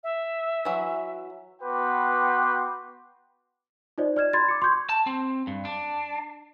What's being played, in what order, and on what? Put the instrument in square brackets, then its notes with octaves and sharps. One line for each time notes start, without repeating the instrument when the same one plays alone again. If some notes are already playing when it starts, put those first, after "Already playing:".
[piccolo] E5
[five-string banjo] E3 F#3
[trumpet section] B3 F#4 B4 G5 C6 D6
[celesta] D#4 F4 C5 D5 D#5
D5 F6 G#6 E7
B5 C6 G#6 A6
D6 C#7
C6 C#6 G6 G#6
[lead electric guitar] A5
C4
G2
D4